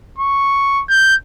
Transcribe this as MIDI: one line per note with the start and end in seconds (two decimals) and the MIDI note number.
0.18 0.82 85
0.89 1.15 91